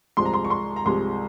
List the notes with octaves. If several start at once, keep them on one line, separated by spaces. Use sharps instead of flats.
C2 C3 F3 G#3 C6
A#5
C6
C#6
C6
A#5
C2 C3 F3 G#3 C6